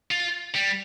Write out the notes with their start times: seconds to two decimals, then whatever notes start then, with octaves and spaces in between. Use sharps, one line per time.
0.11 F4
0.55 G3